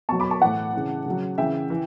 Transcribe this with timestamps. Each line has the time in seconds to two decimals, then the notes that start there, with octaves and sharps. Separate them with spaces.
0.09 B2 F#3 A5 C#6
0.20 B5 D6
0.31 A5 C#6
0.41 A2 E3 F#5 A5
0.73 C#3 E3
1.06 C#3 F#3
1.38 C#3 E3 E5 G5
1.70 E3